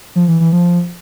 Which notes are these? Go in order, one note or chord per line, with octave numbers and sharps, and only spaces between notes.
F3
E3
E3
F3